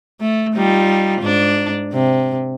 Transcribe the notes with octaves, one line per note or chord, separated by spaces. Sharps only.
A3
G3 D#4 F4
G#2 D4
C3